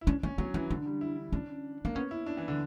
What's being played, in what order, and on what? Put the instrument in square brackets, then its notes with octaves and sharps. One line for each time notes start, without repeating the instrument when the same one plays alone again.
[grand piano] E4
[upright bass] C#4 [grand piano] D4
[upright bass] A#3 [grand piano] C#4
[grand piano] F#3 [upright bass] B3
[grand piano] E3 [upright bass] C#4
[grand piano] D3 [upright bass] D4
[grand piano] G3
E4
[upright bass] C#4 [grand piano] D4
[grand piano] A#3 [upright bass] D4
[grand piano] B3 [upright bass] C#4
[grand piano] E4
D4
E3
D3